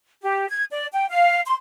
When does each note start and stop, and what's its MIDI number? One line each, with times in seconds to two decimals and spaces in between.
0.22 0.48 67
0.49 0.64 92
0.72 0.87 74
0.93 1.08 79
1.09 1.40 77
1.46 1.55 84